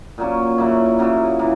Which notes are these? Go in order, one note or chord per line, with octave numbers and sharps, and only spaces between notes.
A#2 F#3 A#3 C#4
C#3 F#3 A#3 E4
C#3 F#3 A#3 E4
E3 A#3